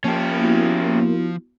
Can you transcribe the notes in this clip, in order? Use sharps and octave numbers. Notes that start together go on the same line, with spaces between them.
F3 A#3 C#4 G4 A5
B3 E4 F#4